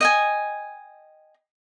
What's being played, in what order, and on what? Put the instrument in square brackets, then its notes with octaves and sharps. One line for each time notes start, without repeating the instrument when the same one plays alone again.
[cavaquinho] D#5 G5 G#5